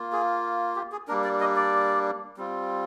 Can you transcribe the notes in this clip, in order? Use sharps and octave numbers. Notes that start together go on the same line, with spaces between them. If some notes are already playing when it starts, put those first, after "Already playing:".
Already playing: A#3 F4
G#4
G4
G#4
G3 A#3 D4 A#4
D5
D#5
D5
G3 C4 F4